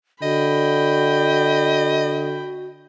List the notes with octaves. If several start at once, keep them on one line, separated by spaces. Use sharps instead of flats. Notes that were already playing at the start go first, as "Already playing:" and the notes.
D3 F#4 D#5 G5 B5